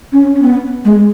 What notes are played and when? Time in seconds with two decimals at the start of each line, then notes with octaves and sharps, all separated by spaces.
0.13 C#4
0.36 C#4
0.42 B3
0.85 G#3